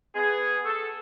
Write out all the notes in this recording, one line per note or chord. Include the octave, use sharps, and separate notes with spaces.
B3 G#4
A4